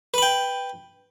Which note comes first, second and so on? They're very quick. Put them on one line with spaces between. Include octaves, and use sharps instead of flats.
B4 B5 G5